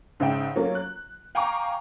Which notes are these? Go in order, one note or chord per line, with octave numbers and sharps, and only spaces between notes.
G#2 C#3 D#4 E5 G5
F#3 A3 A#3 C#4 F4
F#6
F5 G5 G#5 A#5 C#6 D6